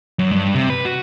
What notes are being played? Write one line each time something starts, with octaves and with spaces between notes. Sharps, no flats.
F#2
G2
C3
B4
F#4